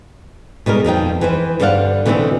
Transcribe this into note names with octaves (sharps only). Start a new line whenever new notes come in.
B2 G3 G#3 A#4
F2 F3 D#4 G5
E3 B4 C5
G2 D3 C5 D5 F5 F#5
B2 D3 E3 A3 C4